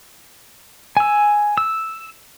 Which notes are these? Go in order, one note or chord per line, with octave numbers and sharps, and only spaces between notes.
G#5 E6
E6